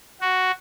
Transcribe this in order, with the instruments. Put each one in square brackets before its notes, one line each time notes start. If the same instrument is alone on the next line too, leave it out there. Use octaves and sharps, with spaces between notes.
[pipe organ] F#4